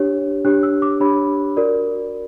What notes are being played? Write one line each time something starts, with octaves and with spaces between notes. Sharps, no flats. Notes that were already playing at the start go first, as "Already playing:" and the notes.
Already playing: D4 G4 C#5
D4 G4 C#5 F#6
E6
D6
D4 G4 C#5 B5
F#4 A#4 D5